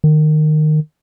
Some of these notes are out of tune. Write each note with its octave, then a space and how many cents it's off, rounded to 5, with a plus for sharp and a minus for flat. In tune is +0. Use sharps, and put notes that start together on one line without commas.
D#3 -20